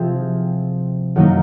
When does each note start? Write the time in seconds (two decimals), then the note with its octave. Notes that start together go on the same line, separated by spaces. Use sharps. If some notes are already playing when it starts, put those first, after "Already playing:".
Already playing: C3 F3 C4 F4 G#4
1.16 F#2 D#3 F#3 A#3 D#4